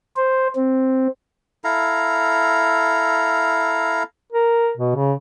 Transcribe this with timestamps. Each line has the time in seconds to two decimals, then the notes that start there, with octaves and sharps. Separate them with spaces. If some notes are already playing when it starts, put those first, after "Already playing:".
0.16 C5
0.55 C4
1.64 E4 A4 F5 A#5
4.32 A#4
4.77 B2
4.96 C#3